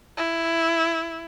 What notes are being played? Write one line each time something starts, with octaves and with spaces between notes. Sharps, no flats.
E4